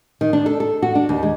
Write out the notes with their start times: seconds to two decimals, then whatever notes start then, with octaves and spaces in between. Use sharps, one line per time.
0.21 D#3
0.33 D4
0.46 A4
0.60 A4
0.83 F#4
0.95 D4
1.09 D#2
1.23 G#3